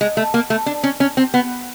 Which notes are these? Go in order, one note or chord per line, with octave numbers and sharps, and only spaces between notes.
G#3
A3
A#3
A3
D4
C#4
C#4
C4
B3